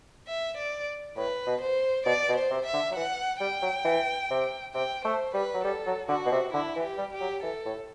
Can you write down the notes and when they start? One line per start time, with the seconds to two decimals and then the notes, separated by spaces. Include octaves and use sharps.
0.27 E5
0.57 D5
1.17 A2 B4
1.46 B2
1.61 C5
2.06 B2 D5
2.29 B2
2.36 C5
2.51 C3
2.66 E5
2.74 D3
2.91 F#3
2.96 E3 F#5
3.40 G3 G5
3.62 F#3
3.85 E3
4.30 C3
4.74 C3 G5
5.05 A3 C5
5.34 G3 B4
5.54 F#3
5.64 G3 A4
5.86 F#3
6.09 D3 F#4
6.26 B2
6.32 C3
6.53 D3 E4
6.76 E3
6.83 G4
6.98 G3
7.13 G4
7.21 F#3
7.43 E3 A4
7.66 A2